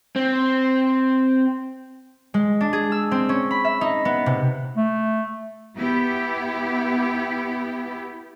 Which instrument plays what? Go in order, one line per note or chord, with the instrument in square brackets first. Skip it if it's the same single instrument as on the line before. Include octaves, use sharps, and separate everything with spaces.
[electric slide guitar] C4
[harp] G#3
D4
G#4
E6
C4
C#4
B5
E5
D#4
B3
C3
[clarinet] A3
[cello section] B3 E4 G4